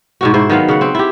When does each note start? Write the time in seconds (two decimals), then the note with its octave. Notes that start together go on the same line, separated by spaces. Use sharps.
0.21 G#2 B2 F#4
0.34 G#2 E4 C5
0.50 D#3 F#3 B3 F5
0.69 C#3 F#5
0.81 C4
0.95 E4 G4